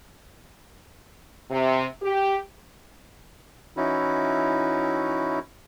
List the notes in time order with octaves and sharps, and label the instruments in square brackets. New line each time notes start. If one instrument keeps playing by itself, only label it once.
[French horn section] C3
G4
[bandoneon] E3 C#4 D#4 E4 F#4